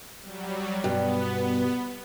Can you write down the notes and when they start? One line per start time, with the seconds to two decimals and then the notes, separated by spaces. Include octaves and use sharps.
0.21 F#3 G3
0.84 G2 B2 B3